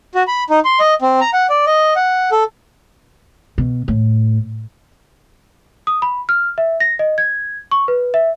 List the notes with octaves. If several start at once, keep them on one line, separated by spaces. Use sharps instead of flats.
F#4
B5
D#4
C6
D#5
C4
A#5
F#5
D5
D#5
F#5
A4
B2
A2
D#6
B5
F6
E5
A#6
D#5
G#6
C#6
B4
E5